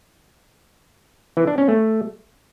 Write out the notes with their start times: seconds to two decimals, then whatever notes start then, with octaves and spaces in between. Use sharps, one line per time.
1.37 E3
1.47 D4
1.58 C#4
1.68 A3